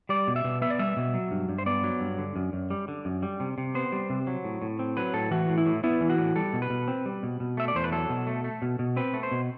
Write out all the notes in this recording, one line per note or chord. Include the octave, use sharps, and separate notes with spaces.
G3 D5
B2
E5
B2
B3 E5
D5
G3 E5
B2
F#3
G2
G2
C5
B3 D5
F#3
G2
D3
F#2
F#2
G3
D3
F#2
G3
C3
C3
B3 C5
G3
C3
F#3
A2
A2
C4
F#3 B4
A2 A4
E3 F#4
A2
E4
A2
B3 E4
E3
F#4
A2
G3 A4
B2
B4
B2
C4
G3
B2
B2
A3 E5
D5
E2 C5
B4
F#3 A4
B2
A3
A3
B2
B2
C4 B4
A3
C5
B2